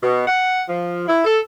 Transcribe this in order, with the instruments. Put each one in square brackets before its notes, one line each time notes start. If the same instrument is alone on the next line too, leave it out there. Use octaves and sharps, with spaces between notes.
[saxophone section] B2
F#5
F3
E4
A4